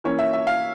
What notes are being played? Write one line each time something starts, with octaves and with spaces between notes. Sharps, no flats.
E3 A#3 C#4 C#5
E5
E5
F5